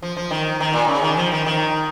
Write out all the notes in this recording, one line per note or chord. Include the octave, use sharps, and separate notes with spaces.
F3
F3
D#3
D#3
A#2
C#3
D#3
F3
D#3
D#3